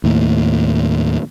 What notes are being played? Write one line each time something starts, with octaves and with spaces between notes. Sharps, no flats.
D#2 A2